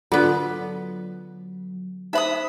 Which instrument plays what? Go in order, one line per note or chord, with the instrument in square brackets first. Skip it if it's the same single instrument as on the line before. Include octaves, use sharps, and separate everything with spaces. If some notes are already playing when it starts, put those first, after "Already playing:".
[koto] D3 B3 [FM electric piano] F#3 [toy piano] F4
[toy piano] D#4 C5 [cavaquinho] E5 B5 D#6